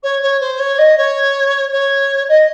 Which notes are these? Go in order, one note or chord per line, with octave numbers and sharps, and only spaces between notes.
C#5
C#5
C5
C#5
D#5
C#5
C#5
D#5